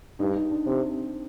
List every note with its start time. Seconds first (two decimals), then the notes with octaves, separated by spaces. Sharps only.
0.20 G2 D#4
0.36 D#4
0.51 D4
0.66 C3 C4